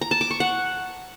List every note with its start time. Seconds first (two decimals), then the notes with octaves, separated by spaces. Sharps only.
0.01 A#5
0.11 A5
0.21 D6
0.31 C#6
0.40 F#5